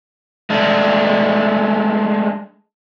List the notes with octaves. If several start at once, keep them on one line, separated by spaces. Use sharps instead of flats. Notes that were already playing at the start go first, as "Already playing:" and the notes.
G#3 A3 D4